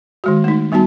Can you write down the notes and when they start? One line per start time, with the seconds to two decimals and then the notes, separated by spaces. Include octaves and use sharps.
0.24 D#3 G#3 F#4
0.44 A3 D#4
0.72 G3 B3 D#4 F#4 A5